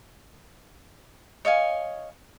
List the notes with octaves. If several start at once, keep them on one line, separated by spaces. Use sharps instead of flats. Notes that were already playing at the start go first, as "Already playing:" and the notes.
C#5 D#5 F5 G#5